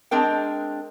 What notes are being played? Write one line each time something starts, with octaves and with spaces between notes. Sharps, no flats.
G#3 C4 D4 A#4 G5